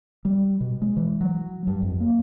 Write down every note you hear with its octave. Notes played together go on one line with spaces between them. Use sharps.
G3
B2
G#3
E3
F#3
G2
F2
A#3